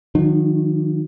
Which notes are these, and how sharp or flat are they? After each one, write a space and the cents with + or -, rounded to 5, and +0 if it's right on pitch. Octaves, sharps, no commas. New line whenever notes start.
D#3 +0 F#3 -40 D4 +45